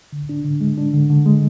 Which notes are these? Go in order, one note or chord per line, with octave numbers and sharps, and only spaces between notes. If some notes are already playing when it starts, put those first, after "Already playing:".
D3
D4
D3
G#3
D4
D3
D3
G#3